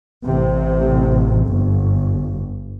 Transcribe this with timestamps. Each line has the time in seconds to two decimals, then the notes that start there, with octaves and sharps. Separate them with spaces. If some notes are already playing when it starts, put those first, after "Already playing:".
0.25 A1 C3
1.47 G1